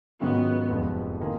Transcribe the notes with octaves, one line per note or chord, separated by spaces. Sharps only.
G#2 D#3 F#3 B3 C#4 F4
F1 F2 F3 G#3 B3
D#3 A#3 F4 G#4